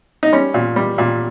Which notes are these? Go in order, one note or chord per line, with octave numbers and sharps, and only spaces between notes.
D#4
G3 C#4
A#2
G3
A#2